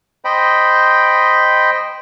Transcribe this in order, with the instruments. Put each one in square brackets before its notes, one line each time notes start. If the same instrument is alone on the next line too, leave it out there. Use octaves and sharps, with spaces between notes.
[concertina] C5 D#5 G5 B5